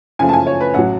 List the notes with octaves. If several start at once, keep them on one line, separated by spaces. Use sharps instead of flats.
F#2 C#3 F3 A3 G#5
A5
G#5
C#5
B4
A1 F#3 F#5